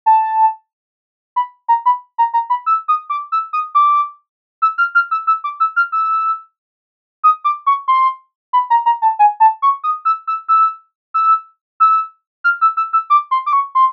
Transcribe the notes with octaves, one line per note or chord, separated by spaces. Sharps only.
A5
B5
A#5
B5
A#5
A#5
B5
E6
D#6
D6
E6
D#6
D6
E6
F6
F6
E6
E6
D6
E6
F6
E6
D#6
D6
C#6
C6
B5
A#5
A#5
A5
G#5
A5
C#6
D#6
E6
E6
E6
E6
E6
F6
E6
E6
E6
D6
C6
D6
C#6
C6